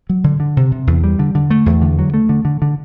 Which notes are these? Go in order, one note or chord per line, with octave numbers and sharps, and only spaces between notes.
F#3
D3
D3
C3
C3
E2
G3
D3
D3
A3
E2
D3
F#3
A3
D3
D3
D3